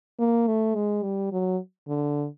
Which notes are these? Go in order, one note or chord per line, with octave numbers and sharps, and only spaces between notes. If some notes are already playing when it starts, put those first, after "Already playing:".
A#3
A3
G#3
G3
F#3
D3